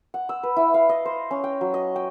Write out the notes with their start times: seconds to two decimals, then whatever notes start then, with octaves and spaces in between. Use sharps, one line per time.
0.14 F#5
0.29 E6
0.43 B4
0.56 E4
0.74 F5
0.89 D#5
1.05 C5
1.31 C#4
1.44 G5
1.61 F#3
1.74 D#5
1.96 G5